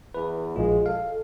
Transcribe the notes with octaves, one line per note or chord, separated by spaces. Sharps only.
E2 B4
A#1 G#3 F4
A4 F5